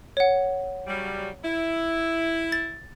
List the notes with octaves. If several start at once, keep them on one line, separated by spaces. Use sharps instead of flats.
C#5 F#5
C#3 F#3 G3
E4
A6